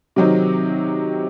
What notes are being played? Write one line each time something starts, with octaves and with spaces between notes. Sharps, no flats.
C3 D#3 F#3 C4 D#4